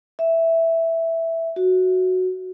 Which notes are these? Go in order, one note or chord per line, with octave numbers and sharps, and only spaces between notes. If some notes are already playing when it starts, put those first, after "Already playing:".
E5
F#4